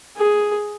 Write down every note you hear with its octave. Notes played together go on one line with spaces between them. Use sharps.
G#4